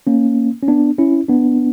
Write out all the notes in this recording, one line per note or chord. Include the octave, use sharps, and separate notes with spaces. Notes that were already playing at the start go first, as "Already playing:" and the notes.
A#3 C#4
C#4
B3 D4
C#4 E4
B3 D4